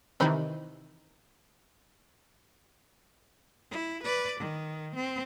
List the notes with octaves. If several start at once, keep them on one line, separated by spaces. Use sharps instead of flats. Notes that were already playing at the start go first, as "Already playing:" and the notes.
C3 D#3 E3 C4 D#4 B5
E4
B4 D5
D#3
C4